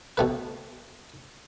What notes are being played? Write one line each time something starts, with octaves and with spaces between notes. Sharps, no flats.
B2 A3 B4